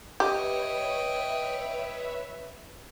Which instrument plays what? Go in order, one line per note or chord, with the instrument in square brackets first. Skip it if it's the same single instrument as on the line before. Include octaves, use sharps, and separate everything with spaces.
[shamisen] G4 [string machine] B4 C#5 E5 [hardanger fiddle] D#5 G5